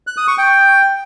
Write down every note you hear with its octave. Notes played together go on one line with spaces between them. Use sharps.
F#6
D#6
C#6
G5